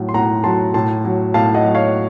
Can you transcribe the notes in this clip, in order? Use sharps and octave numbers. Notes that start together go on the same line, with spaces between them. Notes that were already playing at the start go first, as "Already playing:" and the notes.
Already playing: A2 F#3
C6
A2 F#5 A#5
F#3 A5 C6
A2 A5 C6
F#3
A2 F5 A5
D#5 F#5
F#3
C#5 F5